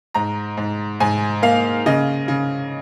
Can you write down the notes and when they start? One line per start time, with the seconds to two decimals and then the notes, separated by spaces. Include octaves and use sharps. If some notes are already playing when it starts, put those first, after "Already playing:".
0.14 G#2 A#5
0.57 G#2
1.00 G#2 G#5
1.42 A#3 F5
1.86 C#3 D#5
2.28 C#3